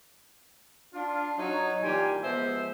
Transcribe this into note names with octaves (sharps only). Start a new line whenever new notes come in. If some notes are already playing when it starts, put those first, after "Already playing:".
D4 F4
F#3 D#4 C#5
A#2 E3 G3 G4 G#5 C6
F3 G#3 B3 C5 E5